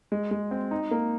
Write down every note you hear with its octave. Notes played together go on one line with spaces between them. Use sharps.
G#3
G#3
C4
D#4
A#3